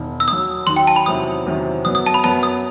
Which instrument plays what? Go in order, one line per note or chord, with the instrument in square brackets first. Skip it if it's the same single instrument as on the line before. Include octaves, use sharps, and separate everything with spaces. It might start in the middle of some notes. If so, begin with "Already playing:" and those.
Already playing: [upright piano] E1 D#3
[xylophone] E6
[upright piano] D#2 D#3 F#3 [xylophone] D#6
[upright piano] D#2 D#3 F#3 [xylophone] C6
[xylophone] G5
A5
B5
[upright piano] E2 C3 D#3 F#3 [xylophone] D#6
[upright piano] E2 C3 D#3 F#3
[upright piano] F#2 F#3 B3 [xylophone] D#6
[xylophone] D#6
A5
B5
[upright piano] F#2 F#3 B3 [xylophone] A5
[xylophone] D#6